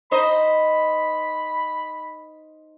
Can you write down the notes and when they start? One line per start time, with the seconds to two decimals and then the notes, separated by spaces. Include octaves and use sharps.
0.11 D#4 C5 D#5 B5